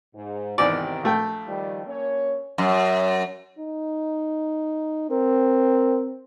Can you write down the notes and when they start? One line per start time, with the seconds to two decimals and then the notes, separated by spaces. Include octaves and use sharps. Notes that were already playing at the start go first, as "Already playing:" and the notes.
0.16 G#2
0.58 E2 G#2 C3 D#3 D5
1.03 A#1 A3 G5
1.47 D#3 F3 G3
1.86 A#3 C#4 C#5
2.58 F#2
3.59 D#4
5.11 C4 A#4